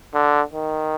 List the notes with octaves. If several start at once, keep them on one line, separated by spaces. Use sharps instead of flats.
D3
D#3